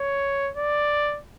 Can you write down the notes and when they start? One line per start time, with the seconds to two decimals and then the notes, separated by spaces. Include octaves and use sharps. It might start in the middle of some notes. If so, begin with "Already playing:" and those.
Already playing: C#5
0.57 D5